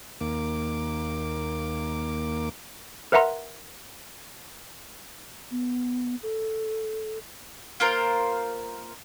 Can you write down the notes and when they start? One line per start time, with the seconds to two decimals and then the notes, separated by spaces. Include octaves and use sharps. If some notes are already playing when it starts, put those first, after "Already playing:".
0.21 D#2 A#3 D6
3.12 A#4 B4 E5 F#5 A#5 C6
5.51 B3
6.23 A4
7.80 A#3 F4 A#4 C5